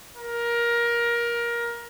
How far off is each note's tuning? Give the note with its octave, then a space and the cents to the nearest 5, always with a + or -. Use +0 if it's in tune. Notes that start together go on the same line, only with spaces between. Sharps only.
A#4 +20